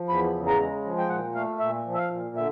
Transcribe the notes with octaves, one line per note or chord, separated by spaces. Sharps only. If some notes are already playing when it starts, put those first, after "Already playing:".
Already playing: F3
E2 B5
C#3
A#5
G#3
F3
G5
A#2 F#5
A3 F5
A#2 E5
F3
E5
F5
A#2
D3 E5